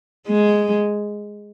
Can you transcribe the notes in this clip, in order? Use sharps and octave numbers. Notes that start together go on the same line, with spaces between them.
G#3